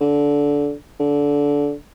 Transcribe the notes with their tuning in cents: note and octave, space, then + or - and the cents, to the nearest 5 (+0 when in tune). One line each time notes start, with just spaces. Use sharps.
D3 -20
D3 -20